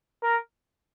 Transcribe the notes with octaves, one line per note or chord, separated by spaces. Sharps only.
A#4